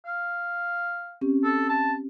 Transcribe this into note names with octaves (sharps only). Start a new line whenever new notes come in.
F5
C4 C#4 G4
A4
A5